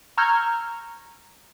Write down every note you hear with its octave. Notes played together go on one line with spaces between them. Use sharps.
A#5 C#6 E6 F6 G6 G#6